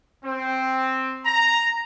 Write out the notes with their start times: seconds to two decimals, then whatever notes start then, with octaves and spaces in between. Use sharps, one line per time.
0.24 C4
1.25 A#5